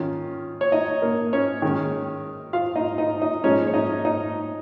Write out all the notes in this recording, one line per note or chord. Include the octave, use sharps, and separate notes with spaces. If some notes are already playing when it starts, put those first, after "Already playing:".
Already playing: D#3 C#4 F4
C#5
D#4 D#5
A#3 A#4
C#4 C#5
D#3 G#3 C#4
F4 F5
D#4 D#5
D#4 D#5
D#4 D#5
F3 G#3 C#4 D#4 C#5
C#5
D#4 D#5
D#4 D#5